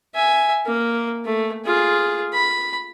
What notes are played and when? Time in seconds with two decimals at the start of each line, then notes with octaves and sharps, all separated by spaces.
0.15 E5 G#5
0.66 A#3
1.25 A3
1.65 F4 G#4
2.33 B5